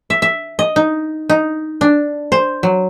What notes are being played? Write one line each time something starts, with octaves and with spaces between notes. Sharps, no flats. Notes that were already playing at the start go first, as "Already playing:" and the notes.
E5
E5
D#5
D#4
D#4
D4
C5
F#3